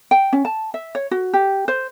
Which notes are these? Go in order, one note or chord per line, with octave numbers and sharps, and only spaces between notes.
G5
C#4
A5
E5
C#5
F#4
G4
C5